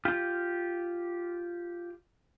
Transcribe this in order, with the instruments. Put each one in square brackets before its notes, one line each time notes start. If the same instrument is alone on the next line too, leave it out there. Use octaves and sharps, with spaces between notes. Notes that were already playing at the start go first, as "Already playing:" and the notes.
[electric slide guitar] F4 G4